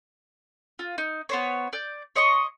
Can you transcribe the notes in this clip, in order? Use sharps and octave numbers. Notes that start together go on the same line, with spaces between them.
F4
D#4
B3 C5 C#5
D5 G6
C#5 D#5 C6 C#6